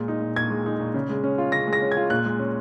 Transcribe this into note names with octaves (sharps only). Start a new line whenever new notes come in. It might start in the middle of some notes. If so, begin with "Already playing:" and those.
Already playing: A#2 G#3
D#4
A#2
A#2 G#6
G#3
D#4
A#2
C#3
G#3
C#4
F4
C#3 A#6
G#3
A#6
C#4
G#6
F4
A#2 F#6
G#3
C#4